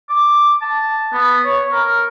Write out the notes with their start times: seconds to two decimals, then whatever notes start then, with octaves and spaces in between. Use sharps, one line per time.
0.09 D6
0.62 A5
1.13 B3
1.45 C#5
1.72 A#4